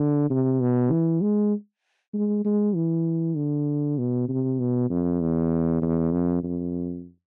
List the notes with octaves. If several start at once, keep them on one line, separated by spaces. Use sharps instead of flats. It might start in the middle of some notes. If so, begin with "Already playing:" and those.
Already playing: D3
C3
B2
E3
G#3
G#3
G#3
E3
D3
B2
C3
B2
F2
E2
E2
F2
F2